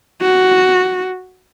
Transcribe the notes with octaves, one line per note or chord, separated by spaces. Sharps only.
F#4